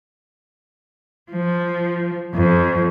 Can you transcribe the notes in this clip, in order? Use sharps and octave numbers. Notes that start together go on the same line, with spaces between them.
F3
F2